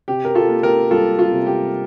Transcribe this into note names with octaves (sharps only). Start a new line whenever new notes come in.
C3 G4
A#4
F4 A4
A#3
G4 A#4
G3 F4 A4
F4
C3
G4